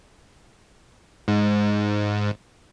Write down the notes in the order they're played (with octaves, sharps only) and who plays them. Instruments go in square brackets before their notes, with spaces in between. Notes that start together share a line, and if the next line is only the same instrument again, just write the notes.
[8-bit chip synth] G#2